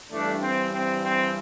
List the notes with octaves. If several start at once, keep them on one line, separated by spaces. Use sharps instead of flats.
G2 E3 G3 A3 D4
C4
C4
C4